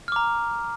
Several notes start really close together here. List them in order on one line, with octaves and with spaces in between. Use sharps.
F6 D6 A#5